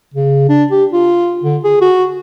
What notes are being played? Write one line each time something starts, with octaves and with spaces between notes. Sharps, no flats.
C#3
D4
G4
F4
D3
G#4
F#4